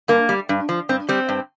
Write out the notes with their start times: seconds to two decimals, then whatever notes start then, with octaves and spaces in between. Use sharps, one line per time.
0.08 G2 A#3
0.29 G3
0.49 G2
0.69 F3
0.89 G2 C4
1.09 G3 C4
1.29 G2